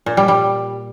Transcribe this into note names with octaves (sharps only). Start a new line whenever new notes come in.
A#2
G3
G3